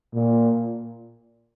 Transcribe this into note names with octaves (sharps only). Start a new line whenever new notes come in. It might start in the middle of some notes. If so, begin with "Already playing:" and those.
A#2